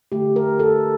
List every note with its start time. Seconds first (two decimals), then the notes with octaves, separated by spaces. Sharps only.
0.12 D3 A3 G4
0.36 A#4
0.60 A4